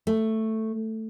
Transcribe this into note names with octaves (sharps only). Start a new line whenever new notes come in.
A3